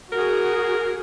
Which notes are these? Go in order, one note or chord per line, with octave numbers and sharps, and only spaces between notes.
F#4 G#4 A#4